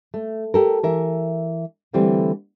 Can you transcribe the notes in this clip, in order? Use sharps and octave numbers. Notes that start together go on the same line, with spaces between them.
A3
G4 A4 A#4
E3 A#4 E5
D3 E3 G3 A3 C4